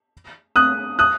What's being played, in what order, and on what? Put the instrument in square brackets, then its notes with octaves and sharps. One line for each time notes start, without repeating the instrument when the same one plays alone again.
[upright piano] D#6 F#6
D#6 F#6